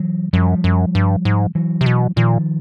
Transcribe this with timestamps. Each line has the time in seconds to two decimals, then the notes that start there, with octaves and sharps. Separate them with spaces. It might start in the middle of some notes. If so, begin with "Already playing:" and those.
Already playing: E3 F#3
0.33 F#2 F3 G3
0.64 F#2
0.95 G2
1.25 G#2
1.55 E3 F#3
1.81 C3
1.86 B2
2.16 A#2 D#3 F3